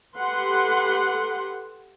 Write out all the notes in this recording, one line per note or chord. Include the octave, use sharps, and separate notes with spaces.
G4 A4 B4 F#5 C6